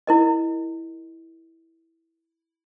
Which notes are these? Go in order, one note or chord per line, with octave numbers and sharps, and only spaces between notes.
E4 A#4 D#5